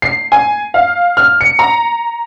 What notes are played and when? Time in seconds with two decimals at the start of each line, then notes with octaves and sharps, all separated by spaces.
0.02 C7
0.32 G#5
0.74 F5
1.17 F6
1.41 C#7
1.59 A#5